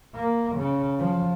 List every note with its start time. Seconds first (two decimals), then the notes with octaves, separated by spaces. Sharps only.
0.15 A#3
0.56 C#3
0.99 F3